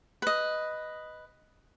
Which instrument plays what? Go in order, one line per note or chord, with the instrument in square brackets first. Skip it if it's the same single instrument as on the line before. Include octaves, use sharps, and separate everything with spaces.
[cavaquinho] B4 D#5